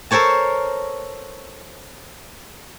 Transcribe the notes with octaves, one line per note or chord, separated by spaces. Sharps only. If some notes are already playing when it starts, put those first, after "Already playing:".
A4 A#4 C5 C#5 A5